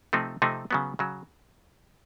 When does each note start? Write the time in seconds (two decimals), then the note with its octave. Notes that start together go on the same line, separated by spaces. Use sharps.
0.13 C3 F3 A3 C4 D#4
0.42 C3 F3 A3 C4 D#4
0.71 C#3 F#3 B3
0.99 C#3 F#3